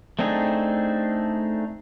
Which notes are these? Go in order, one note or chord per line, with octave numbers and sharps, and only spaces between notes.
A3 C4 D4 D#4 G#4